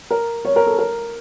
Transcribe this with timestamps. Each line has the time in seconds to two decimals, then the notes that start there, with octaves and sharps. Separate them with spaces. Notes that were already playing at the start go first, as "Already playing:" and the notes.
0.11 A#4
0.45 C#5
0.56 A#4
0.67 A4
0.78 A#4